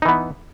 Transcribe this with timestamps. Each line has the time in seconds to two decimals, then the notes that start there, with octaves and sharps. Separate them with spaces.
0.02 D#4
0.05 E3
0.08 B3